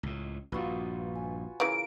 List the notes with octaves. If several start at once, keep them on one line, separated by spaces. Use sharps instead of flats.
C#2 A2
A#1 G2 F4 F#4 B4
G#5
C#3 E3 A#4 F5 D7